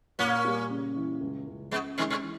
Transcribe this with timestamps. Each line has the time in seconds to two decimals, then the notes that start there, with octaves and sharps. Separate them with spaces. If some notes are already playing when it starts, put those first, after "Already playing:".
0.19 A#2 A#3 C#4
0.45 G3
0.70 C#3
0.96 E3
1.21 C#2
1.47 C#2
1.71 C#3 G#3 B3
1.98 B2 D#3 G#3
2.10 B2
2.23 E3